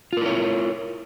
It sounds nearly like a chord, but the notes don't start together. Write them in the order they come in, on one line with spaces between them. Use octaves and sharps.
F4 A#4 E4 C#5